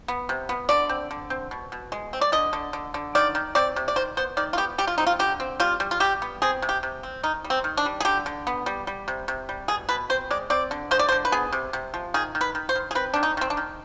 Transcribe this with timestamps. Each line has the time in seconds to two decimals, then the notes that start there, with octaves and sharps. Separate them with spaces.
0.08 B3
0.29 C3
0.49 B3
0.69 D3 D5
0.89 C4
1.11 D3
1.30 C4
1.51 B2
1.72 B2
1.92 G#3
2.13 C4
2.21 D5
2.32 D3 D#5
2.53 D3
2.73 D3
2.94 D3
3.15 D#3 D5
3.35 D#3
3.55 C4 D5
3.76 C3
3.88 D5
3.96 D#3 C5
4.17 B3 C5
4.37 D#3 D5
4.53 F4
4.57 B3 G4
4.78 G3 G4
4.87 F4
4.98 C4 D#4
5.07 F4
5.19 D3 G4
5.40 C4
5.60 G3 F4
5.80 G3
5.91 F4
6.00 G3 G4
6.22 B3
6.42 C4 G#4
6.62 C3
6.69 G4
6.83 C3
7.03 C4
7.23 D#3 D#4
7.44 G3
7.50 C4
7.64 D#3
7.77 D4
7.85 G3
8.00 G#4
8.05 D3 G4
8.26 D3
8.47 B3
8.66 G3
8.87 G3
9.08 C3
9.28 C3
9.49 G3
9.68 B2 G#4
9.89 B2 B4
10.10 C4 C5
10.31 G#3 D5
10.50 C4 D5
10.71 D3
10.91 G#3 C5
10.99 D5
11.09 C5
11.12 D3
11.25 B4
11.32 B3 G#4
11.52 C3
11.73 C3
11.94 F3
12.14 D#3 G#4
12.35 D#3
12.41 B4
12.55 D#3
12.69 C5
12.75 D#3
12.91 G#4
12.95 C4 B4
13.14 D#3 D4
13.23 D#4
13.37 D#3 C4
13.50 D4
13.57 D#3